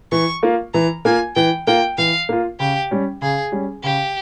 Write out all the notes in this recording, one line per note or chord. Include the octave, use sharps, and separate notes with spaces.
E3 C#6
A#3 F4
E3 A#5
A#3 F4 G#5
E3 G5
A#3 F4 G5
E3 F5
A#3 F4
C#3 G4
G3 C#4
C#3 G#4
G3 C#4
C#3 G4